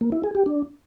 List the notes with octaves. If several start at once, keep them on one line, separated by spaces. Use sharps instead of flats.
A#3
E4
G#4
G4
D4